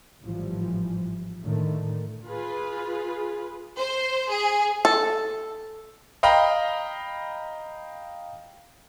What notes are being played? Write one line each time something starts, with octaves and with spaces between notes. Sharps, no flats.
G#1 A2 E3 F3 G3
A2 D3 D#3 A3
F4 G#4 B4
C5
G#4
A4
D#5 F5 G5 A#5 B5